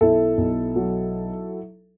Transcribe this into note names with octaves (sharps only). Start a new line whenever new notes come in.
B1 E4 A4
B1
F#3